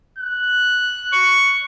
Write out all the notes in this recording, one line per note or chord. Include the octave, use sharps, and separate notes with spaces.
F#6
C#6